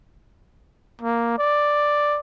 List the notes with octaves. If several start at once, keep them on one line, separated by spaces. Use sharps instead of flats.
A#3
D5